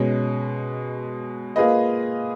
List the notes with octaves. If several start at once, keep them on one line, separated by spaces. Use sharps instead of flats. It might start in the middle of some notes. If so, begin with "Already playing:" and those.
Already playing: B2 G#3 C#4
A#3 F4 G#4 B4 D#5